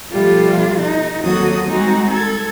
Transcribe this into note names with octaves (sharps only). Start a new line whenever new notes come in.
B2 F3 G3 A3 F4
D#4
D#2 F#3 C4 F#4 A4 D#6
G3 G#3 C4 D#4 F#4
A4 G#6